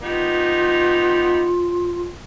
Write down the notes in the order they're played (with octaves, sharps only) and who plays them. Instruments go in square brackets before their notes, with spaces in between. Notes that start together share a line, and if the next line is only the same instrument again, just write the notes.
[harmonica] B3 D#4 G4 [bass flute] F4